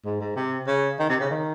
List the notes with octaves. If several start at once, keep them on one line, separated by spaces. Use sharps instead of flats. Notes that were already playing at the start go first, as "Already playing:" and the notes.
G#2
G#2
C3
C#3
D#3
C3
C#3
D#3